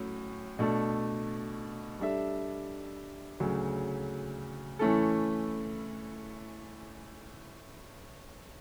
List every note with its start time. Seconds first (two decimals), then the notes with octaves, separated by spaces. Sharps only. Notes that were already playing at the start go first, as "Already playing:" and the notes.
Already playing: A2 F#3 C#4
0.59 B2 A3 D4 A4
2.00 G3 D4 A4 E5
3.40 D2 C#3 F#3
4.79 E3 A3 C#4 E4 A4